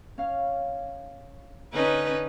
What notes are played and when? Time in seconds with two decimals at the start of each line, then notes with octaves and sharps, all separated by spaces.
0.18 C#4 F5
1.73 D3 C#4 D#4 B4